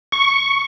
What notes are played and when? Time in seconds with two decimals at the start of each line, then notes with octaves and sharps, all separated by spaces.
0.12 C#6